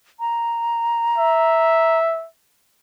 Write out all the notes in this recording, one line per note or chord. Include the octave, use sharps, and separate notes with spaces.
A#5
E5